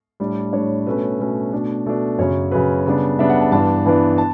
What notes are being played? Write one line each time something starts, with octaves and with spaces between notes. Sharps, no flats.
A2 G3 D4
A2 G3 D4 C#5
B2 A3 C#4 B4
B2 A3 C#4
B2 A3 D4
B2 A3 D4
F#2 C#3 F#3 C#5
F#2 C#3 F#3 B4
C#3 G3 B3 D4
C#3 G3 B3 D4 E5
F#5
A5
G2 E3 B3 D4 A5
G2 E3 B3 D4
A5